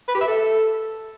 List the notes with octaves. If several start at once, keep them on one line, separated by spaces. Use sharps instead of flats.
B4
G4
E5
A4